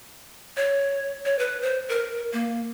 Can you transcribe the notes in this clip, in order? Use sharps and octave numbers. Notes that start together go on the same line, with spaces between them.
C#5
C#5
B4
C5
A#4
A#3